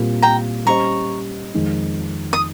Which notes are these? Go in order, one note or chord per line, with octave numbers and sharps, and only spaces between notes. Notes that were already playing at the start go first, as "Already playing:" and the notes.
Already playing: A#2 G3 C4 G4 A#4
G5 A#5
G3 C#4 G4 C5 D#5 A#5 C#6
F2 D#3 G#3 D#4
D#6